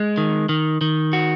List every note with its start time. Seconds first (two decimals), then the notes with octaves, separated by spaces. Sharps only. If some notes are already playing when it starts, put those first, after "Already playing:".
Already playing: G#3
0.17 D#3
0.49 D#3
0.81 D#3
1.13 F#4